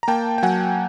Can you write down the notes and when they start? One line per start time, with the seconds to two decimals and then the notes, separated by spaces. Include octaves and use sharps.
0.03 A#5
0.08 A#3 G5 A5
0.38 G5
0.43 F#3 F#5 G#5